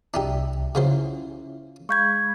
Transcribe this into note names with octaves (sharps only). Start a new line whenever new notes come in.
C2 D4 D#4 G4 E5
C#3 F#3 C#4 E4 F4 C5
G#3 F5 B5 C#6 G6 G#6